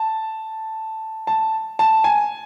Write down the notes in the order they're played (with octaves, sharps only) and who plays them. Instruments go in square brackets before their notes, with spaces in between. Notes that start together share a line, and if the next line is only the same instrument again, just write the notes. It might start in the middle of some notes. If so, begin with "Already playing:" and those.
Already playing: [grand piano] A5
A5
A5
G#5